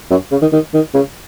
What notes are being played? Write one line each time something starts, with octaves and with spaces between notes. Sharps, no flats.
F#2
C#3
D#3
D#3
D#3
C#3